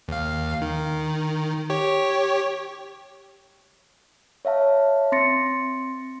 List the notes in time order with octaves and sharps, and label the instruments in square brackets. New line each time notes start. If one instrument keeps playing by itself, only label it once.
[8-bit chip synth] D#2 F5
D#3
G4 C#5
[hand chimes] C#5 E5 F5 A5
C4 C6 A6 A#6 C#7